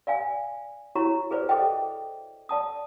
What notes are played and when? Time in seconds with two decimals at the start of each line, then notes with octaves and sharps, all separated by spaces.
0.07 D5 F5 G#5
0.95 E4 F#4 C#5 A#5 C#6
1.31 G#4 B4 C5 D5
1.49 G#4 A4 C5 D#5 E5 G5
2.49 D5 A5 D#6